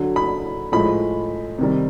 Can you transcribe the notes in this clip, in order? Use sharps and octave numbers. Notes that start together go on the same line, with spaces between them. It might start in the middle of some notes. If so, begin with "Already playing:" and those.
Already playing: D3 F#3
B5
A2 F3 G#3 B5
C3 D#3 G3